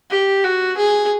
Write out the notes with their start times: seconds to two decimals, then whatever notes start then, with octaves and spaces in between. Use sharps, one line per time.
0.11 G4
0.44 F#4
0.78 G#4